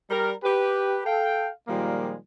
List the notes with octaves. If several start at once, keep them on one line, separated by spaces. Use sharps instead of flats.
G3 A#4
G4 B4
A4 F5 G5
A#2 D#3 F3 G3 G#3 A#3